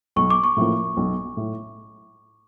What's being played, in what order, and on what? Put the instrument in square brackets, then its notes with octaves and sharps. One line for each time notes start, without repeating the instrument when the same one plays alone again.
[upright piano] B1 [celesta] C#6
[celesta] D6
C#6
[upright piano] A2 F3 A#3
B1
A2